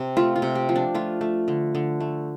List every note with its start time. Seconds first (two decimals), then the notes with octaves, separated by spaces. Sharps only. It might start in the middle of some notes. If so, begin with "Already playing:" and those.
Already playing: C3
0.17 A3 F4
0.36 F4
0.42 C3
0.55 G4
0.69 F3
0.76 D4
0.95 A3 F4
1.21 A3
1.48 D3
1.75 D3
2.00 A3